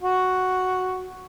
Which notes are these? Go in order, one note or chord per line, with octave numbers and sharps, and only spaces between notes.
F#4